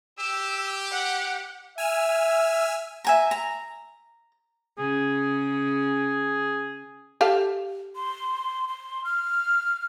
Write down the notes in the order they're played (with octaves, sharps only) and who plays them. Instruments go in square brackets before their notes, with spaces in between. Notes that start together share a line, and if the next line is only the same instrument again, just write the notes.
[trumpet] G4 [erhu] E6
[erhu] F#5
[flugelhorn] E5 [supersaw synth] G#5 E6 F6
[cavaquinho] E5 G#5 A#5
A#5
[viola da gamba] C#3 [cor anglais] G#4
[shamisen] G4 A4 F5
[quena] C6
C6
F6